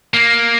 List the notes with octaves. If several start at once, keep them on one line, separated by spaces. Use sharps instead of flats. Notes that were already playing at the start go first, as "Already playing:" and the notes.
A#3